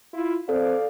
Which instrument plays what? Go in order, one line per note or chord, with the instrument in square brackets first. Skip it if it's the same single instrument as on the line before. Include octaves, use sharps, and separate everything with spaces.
[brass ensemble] E4 F4
[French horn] C4 [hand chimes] A4 [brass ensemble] D5 F5